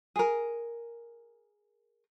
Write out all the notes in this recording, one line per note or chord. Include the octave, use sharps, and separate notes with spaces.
G#4 A#4